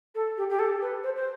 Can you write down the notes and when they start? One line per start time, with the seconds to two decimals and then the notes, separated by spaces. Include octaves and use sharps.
0.15 A4
0.37 G4
0.50 G4
0.59 A4
0.81 B4
1.03 C5
1.16 C5